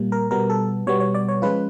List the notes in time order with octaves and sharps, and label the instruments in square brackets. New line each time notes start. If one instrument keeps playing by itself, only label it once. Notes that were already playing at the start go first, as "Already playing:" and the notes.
Already playing: [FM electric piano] A#2 G3 A#3
A#4
B2 G3 B3 A#4
A4
B2 G3 B3 C#5
C#5
D5
C#5
F3 G#3 C#4 F4 B4